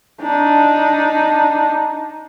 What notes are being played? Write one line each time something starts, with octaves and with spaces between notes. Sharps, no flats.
D4 D#4